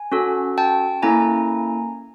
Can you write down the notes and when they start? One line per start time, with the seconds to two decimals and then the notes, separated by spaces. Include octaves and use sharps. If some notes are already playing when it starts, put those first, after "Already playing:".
Already playing: G#5
0.12 C#4 F#4 A4
0.58 G5 A5
1.02 A#3 C#4 E4 A4 G#5 A#5